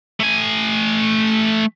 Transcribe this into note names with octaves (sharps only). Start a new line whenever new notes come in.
A3 G#5